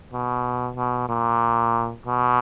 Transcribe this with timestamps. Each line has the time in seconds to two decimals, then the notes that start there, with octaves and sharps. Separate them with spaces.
0.12 B2
0.76 B2
1.09 A#2
2.06 B2